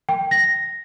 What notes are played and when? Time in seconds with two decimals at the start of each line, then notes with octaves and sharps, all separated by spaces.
0.09 G5
0.31 A#6